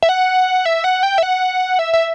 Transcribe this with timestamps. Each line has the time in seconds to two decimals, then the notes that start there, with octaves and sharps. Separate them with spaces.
0.03 E5
0.09 F#5
0.65 E5
0.84 F#5
1.03 G5
1.18 E5
1.23 F#5
1.79 E5
1.94 E5